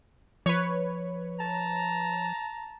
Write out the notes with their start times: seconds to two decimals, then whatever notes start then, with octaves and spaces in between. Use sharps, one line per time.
0.46 F3 B4 C#5
1.40 A5 A#5